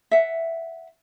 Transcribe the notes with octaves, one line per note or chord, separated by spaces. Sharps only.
E5 F#5